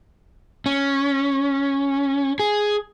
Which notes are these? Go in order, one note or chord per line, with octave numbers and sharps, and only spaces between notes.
C#4
G#4